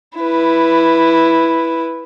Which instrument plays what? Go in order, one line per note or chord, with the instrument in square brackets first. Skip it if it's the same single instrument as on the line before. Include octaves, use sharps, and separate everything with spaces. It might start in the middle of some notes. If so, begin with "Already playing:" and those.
[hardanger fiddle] E4 B4